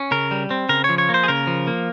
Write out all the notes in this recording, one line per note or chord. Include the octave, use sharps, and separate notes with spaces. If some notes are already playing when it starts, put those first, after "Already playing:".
Already playing: C#4
C#3 A#4
G3
C4
C#3 A#4
F3 C#5
C#5
A#3
C5
G#4
C#3 A#4
F3
A#3